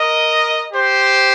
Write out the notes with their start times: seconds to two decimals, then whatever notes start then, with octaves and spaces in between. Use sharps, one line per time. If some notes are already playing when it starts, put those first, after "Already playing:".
Already playing: A#4 D#5
0.73 G4 C5